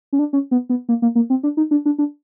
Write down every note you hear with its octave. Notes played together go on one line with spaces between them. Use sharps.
C#4
D4
C#4
B3
B3
A#3
A#3
A#3
C4
D4
D#4
D4
D4
D4